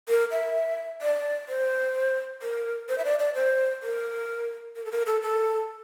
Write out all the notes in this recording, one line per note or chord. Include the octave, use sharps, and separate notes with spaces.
A#4
E5
D5
C5
A#4
C5
E5
D5
D5
C5
A#4
A#4
A4
A#4
A4
A4